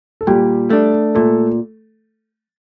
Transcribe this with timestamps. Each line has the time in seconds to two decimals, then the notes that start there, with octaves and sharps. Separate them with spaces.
0.21 A4
0.27 A#2 G3 G4
0.70 A3 D4
1.15 A#2 A3 A4